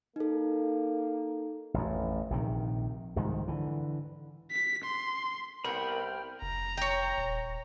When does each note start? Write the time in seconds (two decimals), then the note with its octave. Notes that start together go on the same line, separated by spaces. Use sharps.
0.16 A#3 D#4 A4
1.74 A1 F2
2.30 A#1 C3 D#3
3.16 C2 G#2 D#3 F3
3.48 D3 E3
4.51 B6
4.85 C6
5.64 C2 A#3 B3 A#4 G5 B5 F6
6.42 F1 A#5
6.77 C#5 G5
7.18 D#1